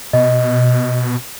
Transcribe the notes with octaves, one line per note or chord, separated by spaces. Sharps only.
B2 D#5